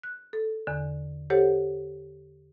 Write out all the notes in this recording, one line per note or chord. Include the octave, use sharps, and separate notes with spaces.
F#6
A4
E2 D3
G4 A4 C5 C#5 F#5